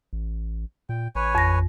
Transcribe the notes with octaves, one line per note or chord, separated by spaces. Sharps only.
A1
A#2 G5
A1 B4 C#5 G#5
F2 A#6